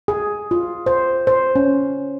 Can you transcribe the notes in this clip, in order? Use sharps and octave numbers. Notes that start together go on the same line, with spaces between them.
G#4
F4
C5
C5
C#4